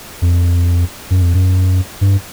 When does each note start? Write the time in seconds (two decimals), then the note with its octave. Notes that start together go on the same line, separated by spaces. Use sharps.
0.22 F2
1.10 F#2
1.22 F2
1.34 F#2
2.01 G2